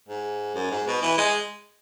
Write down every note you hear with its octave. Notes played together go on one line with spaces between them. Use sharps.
G#2
F#2
G#2
B2
E3
G#3